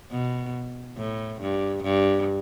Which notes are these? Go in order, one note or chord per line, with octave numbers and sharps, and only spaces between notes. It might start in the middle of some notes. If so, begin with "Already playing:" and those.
B2
A2
G2
G2